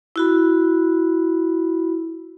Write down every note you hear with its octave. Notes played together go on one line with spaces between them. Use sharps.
E4 F#4 B5